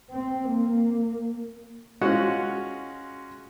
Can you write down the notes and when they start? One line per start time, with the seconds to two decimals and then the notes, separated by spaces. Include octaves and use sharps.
0.11 C4
0.49 A#3
2.01 G#3 C#4 F4 F#4 F#5